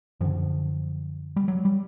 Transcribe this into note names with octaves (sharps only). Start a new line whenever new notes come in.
F#2 D3 F3
G3
F#3
G3